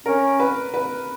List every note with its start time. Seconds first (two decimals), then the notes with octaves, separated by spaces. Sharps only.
0.06 C#4 A#4
0.40 B4
0.74 B4